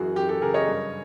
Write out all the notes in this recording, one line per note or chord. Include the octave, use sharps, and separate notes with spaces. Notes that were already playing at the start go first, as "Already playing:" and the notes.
Already playing: F#2 E3 F#4 G#4
F#2 G4
G4 A4
C#3 G#4 A#4
C#5 D#5
G2